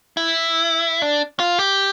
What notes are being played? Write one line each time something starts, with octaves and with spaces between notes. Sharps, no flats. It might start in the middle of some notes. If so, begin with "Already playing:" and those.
E4
D4
F4
G4